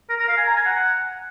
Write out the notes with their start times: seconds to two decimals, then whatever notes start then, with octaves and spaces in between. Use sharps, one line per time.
0.09 A#4
0.19 A#4
0.28 F5
0.37 G#5
0.47 A#5
0.56 G#5
0.65 F#5